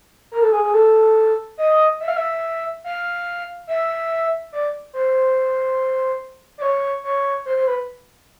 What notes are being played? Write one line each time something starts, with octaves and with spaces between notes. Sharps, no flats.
A#4
A4
G#4
G#4
A4
D#5
E5
F5
E5
F5
E5
D5
C5
D5
C#5
C#5
C5
C5
B4